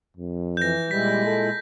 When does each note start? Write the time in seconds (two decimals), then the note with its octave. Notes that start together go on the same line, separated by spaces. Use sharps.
0.17 F2
0.57 E3 G6 A#6
0.91 A#2 G3 G#3 E4 B6
1.26 A4